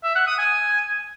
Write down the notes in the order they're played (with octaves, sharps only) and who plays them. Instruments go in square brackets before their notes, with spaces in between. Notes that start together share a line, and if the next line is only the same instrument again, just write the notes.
[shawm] E5
F#5
D#6
G#5